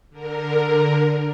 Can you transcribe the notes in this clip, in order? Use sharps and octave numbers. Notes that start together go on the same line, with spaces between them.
D3 A#4